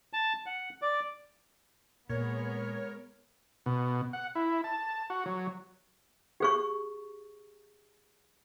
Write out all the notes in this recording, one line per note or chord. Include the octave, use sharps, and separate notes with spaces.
A5
F#5
D5
A#2 G#3 B3 A#4 C#5
B2
F#5
E4
A5
F#4
F#3
G4 G#4 C#6